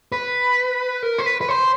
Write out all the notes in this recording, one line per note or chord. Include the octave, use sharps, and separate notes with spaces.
B4
A#4
C5
B4
B4
C5